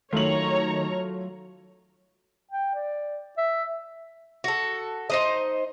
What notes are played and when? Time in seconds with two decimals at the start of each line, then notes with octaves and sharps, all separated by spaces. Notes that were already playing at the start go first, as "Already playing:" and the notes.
0.13 D#3 F#3 A3 F4 C#5 A#5 F#7
2.51 G5
2.75 D5
3.37 E5
4.44 F#4 A4
5.10 D#4 C5 D#5